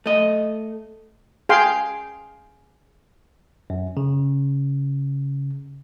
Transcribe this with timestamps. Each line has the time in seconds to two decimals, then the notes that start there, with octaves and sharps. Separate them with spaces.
0.06 A3 D#5
1.49 G#4 F5 G5 C6
3.70 F#2
3.97 C#3